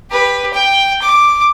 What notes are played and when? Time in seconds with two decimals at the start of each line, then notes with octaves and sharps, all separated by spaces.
0.10 G4 B4
0.53 G5
1.01 D6